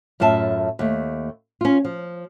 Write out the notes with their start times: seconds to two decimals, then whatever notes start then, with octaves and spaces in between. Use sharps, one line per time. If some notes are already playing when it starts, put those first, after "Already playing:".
0.20 F#2 A2 F4 E5 A5
0.79 D#2 A3
1.61 C#4 F4
1.85 F3